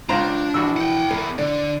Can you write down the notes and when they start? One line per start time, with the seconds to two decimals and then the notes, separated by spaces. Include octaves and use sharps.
0.09 C#2 D4 F4 C5 A#5
0.54 A#1 E3 F#4 E6
0.77 F#5 G5
1.11 E2 E3 A#4
1.38 D3 D5